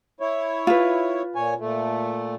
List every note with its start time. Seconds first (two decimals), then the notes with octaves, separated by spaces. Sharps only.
0.20 E4 C#5
0.67 F4 B4
1.35 A#2 C#5 G#5
1.60 A#2 A3